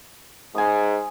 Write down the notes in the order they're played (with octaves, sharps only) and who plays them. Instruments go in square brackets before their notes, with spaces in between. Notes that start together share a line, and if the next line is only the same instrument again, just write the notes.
[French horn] G#2 [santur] G#5 D#6